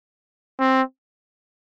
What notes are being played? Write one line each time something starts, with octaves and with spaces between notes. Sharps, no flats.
C4